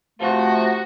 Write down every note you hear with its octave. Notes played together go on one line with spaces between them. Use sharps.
C3 F3 A3 F#4